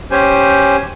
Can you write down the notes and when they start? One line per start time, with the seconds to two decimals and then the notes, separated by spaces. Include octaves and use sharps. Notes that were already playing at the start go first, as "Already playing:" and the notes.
0.11 C#4 G4 C5 G#5